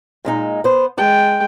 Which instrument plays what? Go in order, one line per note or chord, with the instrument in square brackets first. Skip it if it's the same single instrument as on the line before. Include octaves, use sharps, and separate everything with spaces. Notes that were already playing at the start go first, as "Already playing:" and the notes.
[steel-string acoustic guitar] A#2 G#3 D#4
B3 C5
[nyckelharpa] G#3 G5 [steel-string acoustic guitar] A5